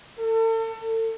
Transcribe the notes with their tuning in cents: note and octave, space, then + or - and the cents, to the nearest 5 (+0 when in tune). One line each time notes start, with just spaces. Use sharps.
A4 +35